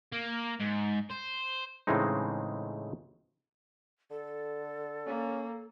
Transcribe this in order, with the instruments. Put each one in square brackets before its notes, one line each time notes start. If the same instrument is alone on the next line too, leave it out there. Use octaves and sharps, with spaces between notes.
[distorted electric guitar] A#3
G#2
C5
[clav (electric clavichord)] A2 C#3 E3 G#3 C4 D#4
[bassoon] D3 [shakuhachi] A4
[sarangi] A#3 [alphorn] C#4